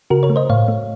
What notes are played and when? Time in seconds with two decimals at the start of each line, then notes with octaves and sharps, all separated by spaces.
0.10 C#3 F#4 A#4
0.23 A#4 C#5
0.30 A3
0.36 C5 D#5
0.50 A2 C#5 F5
0.68 A3